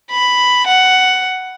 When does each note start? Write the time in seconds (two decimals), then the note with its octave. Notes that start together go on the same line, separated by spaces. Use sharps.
0.11 B5
0.67 F#5